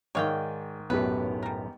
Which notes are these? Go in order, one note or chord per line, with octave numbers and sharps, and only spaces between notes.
G#2 D#3 G#3 C#5 D5 F5 G5
B1 F#2 A2 B3 G4 B4
G3 A#4